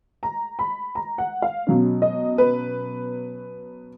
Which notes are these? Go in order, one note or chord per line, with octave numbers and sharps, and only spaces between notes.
A#5
B5
A#5
F#5
F5
B2 F#3 C#4
D#5
B4